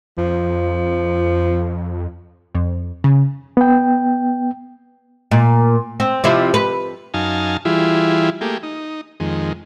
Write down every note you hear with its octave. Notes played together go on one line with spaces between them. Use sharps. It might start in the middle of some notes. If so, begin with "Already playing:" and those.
F2 F3
F2
C#3
B3 G5
A#2
C4
C3 F3 E4
B4
F#2 D#4 F5 G#5 A5
E3 G3 E4 F4 G#4
A3 A#3 G4 G#4
D#4
F2 D#3 G#3